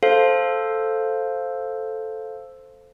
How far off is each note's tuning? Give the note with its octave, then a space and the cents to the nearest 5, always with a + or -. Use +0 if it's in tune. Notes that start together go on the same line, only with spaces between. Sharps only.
A4 +0 C5 +0 F5 +0